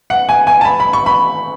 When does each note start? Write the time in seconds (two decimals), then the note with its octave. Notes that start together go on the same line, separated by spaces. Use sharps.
0.10 F#5
0.29 G#5
0.47 G#5
0.61 A5
0.65 B5
0.80 B5
0.93 C#6
1.06 B5